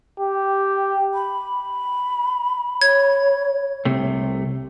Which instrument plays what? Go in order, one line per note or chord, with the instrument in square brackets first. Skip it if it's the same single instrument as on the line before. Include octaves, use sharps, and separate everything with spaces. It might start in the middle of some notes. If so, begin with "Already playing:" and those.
[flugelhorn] G4
[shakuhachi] B5
[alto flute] C#5 [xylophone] G#6
[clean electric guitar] C2 C3 A3